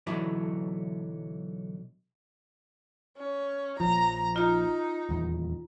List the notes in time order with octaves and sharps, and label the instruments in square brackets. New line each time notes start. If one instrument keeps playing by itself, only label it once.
[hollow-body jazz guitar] B1 D3 E3 F#3 E4 D5
[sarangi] C#4
[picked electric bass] A#1 F3 [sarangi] A#5
[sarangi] D#4 [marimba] F4 A#5
[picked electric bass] D#1 E2